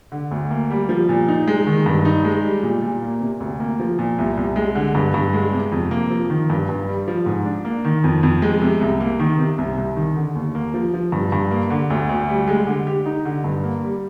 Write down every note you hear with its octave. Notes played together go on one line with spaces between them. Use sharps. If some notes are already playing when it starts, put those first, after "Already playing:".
D3
D2
A#3
G3
F3
A#2
D#4
G#3
D#3
G2
D#4
G#3
G3
A#2
A#2
A#3
C3
D2
A#3
F3
A#2
C2
C2
G#3
D3
G2
G2
G#3
C3
F2
A#3
F3
D#3
G2
G2
G3
F3
G#2
D4
A#3
D#3
F2
F2
G#3
C3
C2
A#3
D#3
C3
C2
C2
D#3
D3
D#2
A#3
F3
F3
G2
G2
A#3
D3
D2
D2
G3
G#3
D3
G4
D#4
D3
G2
A#3
G3